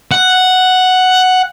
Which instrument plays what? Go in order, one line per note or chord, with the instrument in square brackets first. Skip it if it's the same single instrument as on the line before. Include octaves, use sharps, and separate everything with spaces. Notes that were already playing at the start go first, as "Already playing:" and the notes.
[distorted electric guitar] F#5